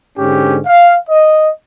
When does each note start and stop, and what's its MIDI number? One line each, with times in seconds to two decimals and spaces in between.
0.18 0.57 44
0.18 0.57 50
0.18 0.57 61
0.18 0.57 67
0.65 0.93 77
1.08 1.48 75